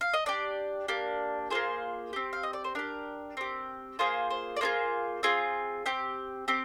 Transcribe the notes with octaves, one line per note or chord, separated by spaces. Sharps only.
F5
D#5
D4 G4 D5
A#3 D4 G4
A#3 F4 G#4 C5
C4 G4
F5
D#5
D5
C5
D4 G4 A#4
C4 G4
A#3 F4 G#4 C5
C5
D5
A#3 D4 F4 G#4 C5
C4 F4 G#4
C4 G4
C4 G4